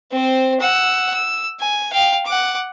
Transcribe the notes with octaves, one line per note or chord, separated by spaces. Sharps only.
C4 C5
F#5 E6
E6
G#5
F5 G5
F#5 D6